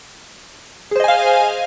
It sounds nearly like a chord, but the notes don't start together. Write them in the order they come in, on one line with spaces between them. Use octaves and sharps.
G#4 C5 D#5 G#5 F5